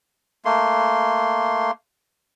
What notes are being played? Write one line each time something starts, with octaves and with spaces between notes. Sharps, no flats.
A3 A#3 C6